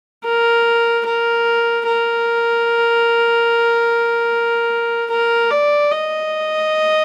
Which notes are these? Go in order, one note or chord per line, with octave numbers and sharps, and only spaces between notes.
A#4
A#4
A#4
A#4
D5
D#5